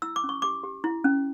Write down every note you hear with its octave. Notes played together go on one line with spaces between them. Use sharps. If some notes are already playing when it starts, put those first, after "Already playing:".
E4 E6
D6
C#4
C#6
G4 D6
G4
E4
C#4